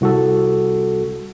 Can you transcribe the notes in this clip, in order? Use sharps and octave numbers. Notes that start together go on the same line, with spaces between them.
C2 F#4 A4